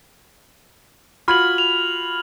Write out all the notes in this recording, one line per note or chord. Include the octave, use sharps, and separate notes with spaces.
F4 F#4 B5 F6 G#6 F#7
F7